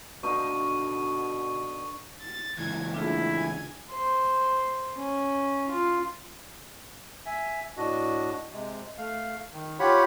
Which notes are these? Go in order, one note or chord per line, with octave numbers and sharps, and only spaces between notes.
B2 D3 D#4 F5 C#6
A6
C#2 E3 G#6
A3 A#3 D4 E4 F4 G#4
G#5 G#6
C5
C#4
F4
E5 G#5
A2 D4 F#4 D#5
C3 G#3
A3 F5
D#3
F4 G4 C#5 F#5 B5